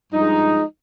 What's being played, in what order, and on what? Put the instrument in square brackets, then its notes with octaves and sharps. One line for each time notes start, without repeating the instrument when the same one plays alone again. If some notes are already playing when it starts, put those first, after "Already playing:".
[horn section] G2 F3 G#3 D#4